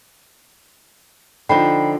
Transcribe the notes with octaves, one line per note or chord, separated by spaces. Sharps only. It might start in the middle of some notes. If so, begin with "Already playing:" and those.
D3 F3 D#4 G5 B5 C7